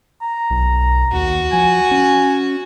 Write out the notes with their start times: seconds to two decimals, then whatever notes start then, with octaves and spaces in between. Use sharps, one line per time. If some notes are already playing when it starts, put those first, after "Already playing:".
0.22 A#5
0.50 B1
1.13 D#2 F#4
1.53 F3 G#5
1.91 C#4